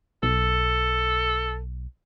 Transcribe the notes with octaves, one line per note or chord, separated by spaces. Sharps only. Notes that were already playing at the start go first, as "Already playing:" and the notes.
B1 A4